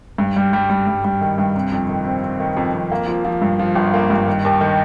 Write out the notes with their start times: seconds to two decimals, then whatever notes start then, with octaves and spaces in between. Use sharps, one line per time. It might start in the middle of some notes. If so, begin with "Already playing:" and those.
0.18 G2
0.36 G3
0.53 G3
0.70 G3
0.87 G2
1.05 G3
1.21 D#3
1.38 G2
1.56 C3
1.72 F2
1.89 D#3
2.05 C4
2.23 C4
2.40 D#3
2.57 F2
2.74 F2
2.92 A#3
3.08 F3
3.25 F3
3.42 G2
3.59 F3
3.75 G1
3.94 A#3
4.10 G2
4.28 D#3
4.45 D#2
4.61 D#3